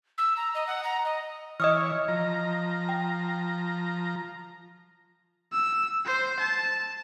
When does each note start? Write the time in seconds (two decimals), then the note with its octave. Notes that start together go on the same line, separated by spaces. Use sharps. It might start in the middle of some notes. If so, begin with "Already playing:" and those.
0.18 E6
0.37 A#5
0.55 D#5
0.67 F#5
0.84 A#5
1.05 D#5
1.60 E3 C#5 D#5 D#6 F6
2.08 F3 A#5
2.89 G5
5.52 E6
6.06 C5
6.40 A5